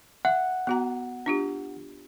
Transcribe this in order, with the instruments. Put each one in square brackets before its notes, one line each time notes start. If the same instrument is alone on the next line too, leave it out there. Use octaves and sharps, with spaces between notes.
[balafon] E5 [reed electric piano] F#5
[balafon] B3 F#4 A#5
D4 F4 G4